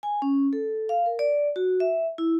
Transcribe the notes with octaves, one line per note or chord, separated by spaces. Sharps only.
G#5
C#4
A4
F5
A#4
D5
F#4
E5
E4